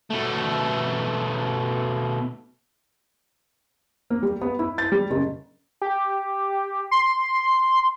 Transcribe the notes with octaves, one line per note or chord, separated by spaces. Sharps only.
B2 A3
A#3
G3
B3
E4
A6
G3
F#1
G4
C6